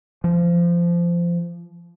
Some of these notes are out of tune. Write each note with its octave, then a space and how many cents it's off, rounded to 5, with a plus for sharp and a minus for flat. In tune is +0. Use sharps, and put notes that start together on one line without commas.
F3 -20